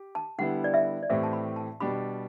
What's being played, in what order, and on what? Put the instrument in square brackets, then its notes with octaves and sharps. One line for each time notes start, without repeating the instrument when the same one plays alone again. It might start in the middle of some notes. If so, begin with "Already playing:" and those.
Already playing: [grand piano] G4
[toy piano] A5
[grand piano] D3 G3 B3 E4 [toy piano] F#5
[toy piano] D5
E5
D5
[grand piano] A2 E3 A3 C4 G4 [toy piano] E5
[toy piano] A5
B5
A5
[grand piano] B2 G3 D4 G4 [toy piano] B5